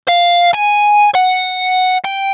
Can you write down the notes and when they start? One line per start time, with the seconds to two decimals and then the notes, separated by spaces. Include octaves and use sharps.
0.08 F5
0.53 G#5
1.15 F#5
2.05 G5